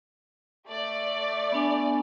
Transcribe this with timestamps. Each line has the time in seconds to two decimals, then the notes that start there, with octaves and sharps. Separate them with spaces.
0.69 A3 D5
1.52 B3 D4 G#5